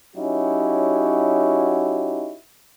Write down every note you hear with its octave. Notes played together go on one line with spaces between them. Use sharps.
F#3 C#4 D#4 E4 F#4 G4